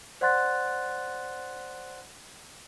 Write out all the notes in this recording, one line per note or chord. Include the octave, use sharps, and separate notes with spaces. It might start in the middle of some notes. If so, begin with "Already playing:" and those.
C5 D5 F#5 C6 F#6 A6